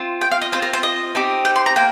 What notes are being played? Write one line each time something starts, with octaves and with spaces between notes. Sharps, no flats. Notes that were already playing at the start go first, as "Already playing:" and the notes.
Already playing: C4 F4
G5
F5
D#5
C4 F4 C5
A#4
C5
D#5
C4 D#4 G4
G5
C6
A#5
A#3 G5